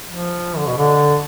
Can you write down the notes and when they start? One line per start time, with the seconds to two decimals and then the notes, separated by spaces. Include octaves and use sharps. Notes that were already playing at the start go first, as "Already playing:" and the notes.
0.09 F3
0.57 D3
0.67 B2
0.77 D3